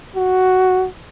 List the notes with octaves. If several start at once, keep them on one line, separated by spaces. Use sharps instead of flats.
F#4